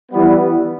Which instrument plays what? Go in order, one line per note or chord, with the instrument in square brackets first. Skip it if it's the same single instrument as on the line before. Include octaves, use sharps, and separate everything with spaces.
[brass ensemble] E3 G3 B3